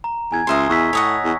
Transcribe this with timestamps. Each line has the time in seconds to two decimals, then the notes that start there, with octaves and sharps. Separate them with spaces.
0.04 A#5
0.32 E2 G#5 G#6
0.47 C#2 D#5 E5 C6
0.70 E2 C#6 E6 B6
0.93 A2 C#5 D#5 F#5
1.24 E2